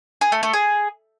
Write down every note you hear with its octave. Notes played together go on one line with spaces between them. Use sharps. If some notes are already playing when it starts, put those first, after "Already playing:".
G#4
A3
A3
G#4